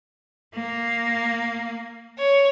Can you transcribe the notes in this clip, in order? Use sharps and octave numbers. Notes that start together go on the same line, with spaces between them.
A#3
C#5